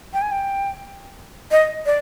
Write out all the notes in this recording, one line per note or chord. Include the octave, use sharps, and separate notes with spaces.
G5
G#5
G5
D#5
D5